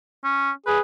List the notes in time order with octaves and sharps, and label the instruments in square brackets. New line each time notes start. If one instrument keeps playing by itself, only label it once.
[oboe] C#4
[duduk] G#4 [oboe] B4